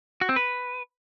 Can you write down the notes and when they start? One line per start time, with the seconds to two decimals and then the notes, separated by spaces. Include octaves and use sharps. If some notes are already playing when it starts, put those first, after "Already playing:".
0.21 F#4
0.29 C4
0.36 B4